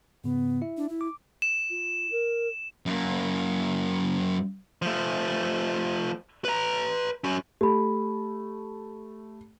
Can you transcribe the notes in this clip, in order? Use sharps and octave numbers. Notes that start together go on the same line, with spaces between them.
G#2 C#3 B3
E4 E5
D4
E4
D6
E7
F4
A#4
F#2 A#3
F3 A3
B4 A#5
C#4 F#4
A3 G4 B5